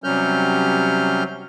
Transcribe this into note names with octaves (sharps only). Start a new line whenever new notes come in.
C3 F#3 G3 C#4 F6 G6